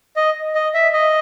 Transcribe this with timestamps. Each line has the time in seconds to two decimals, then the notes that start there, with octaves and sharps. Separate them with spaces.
0.16 D#5
0.55 D#5
0.74 E5
0.93 D#5